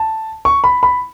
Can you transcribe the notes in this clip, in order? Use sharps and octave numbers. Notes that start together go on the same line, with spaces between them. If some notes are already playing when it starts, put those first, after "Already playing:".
Already playing: A5
C#6
B5
B5